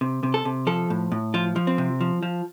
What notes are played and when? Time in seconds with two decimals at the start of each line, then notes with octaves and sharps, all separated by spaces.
0.01 C3
0.23 C3
0.34 A4
0.45 C3
0.67 F3 A4
0.90 A2
1.12 A2
1.34 F3 F4
1.56 F3
1.67 C4
1.78 C3
2.01 F3
2.23 F3